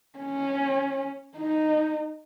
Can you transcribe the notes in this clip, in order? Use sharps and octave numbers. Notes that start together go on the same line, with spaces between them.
C#4
D#4